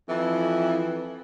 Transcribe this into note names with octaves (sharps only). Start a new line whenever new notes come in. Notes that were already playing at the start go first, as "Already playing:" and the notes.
F2 E3